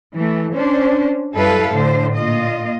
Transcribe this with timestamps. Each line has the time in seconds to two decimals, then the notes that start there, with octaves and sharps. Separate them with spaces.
0.14 E3 A3
0.54 C#4 D4 C5
1.35 F#2 G3 E4 A4 B4 F5
1.71 A2 D3 C5
2.15 A#2 F4 D#5